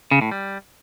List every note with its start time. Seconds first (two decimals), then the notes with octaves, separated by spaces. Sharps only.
0.11 C#3
0.21 A2
0.31 G3